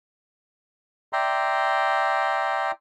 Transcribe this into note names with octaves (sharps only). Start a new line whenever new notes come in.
D5 E5 G5 A#5 C6